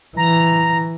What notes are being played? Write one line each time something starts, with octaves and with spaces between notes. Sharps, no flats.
E3 A#5